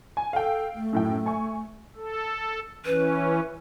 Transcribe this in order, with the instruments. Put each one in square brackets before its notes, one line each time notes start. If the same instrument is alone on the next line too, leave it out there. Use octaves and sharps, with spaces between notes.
[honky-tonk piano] G#5
[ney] A4 [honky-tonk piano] F5 G5
[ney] A3
[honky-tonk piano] F#2 A2 G5
G#5 C#6
[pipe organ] A4
[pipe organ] E3 C#4 [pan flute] B4